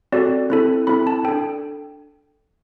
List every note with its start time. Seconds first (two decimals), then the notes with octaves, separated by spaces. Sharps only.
0.12 C4 F#4 A4 D5
0.50 C4 E4 A4
0.87 C4 E4 A4 B5
1.07 A5
1.25 D4 A4 G5